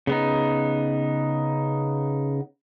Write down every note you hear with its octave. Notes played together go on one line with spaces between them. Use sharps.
C#3 B3 D#4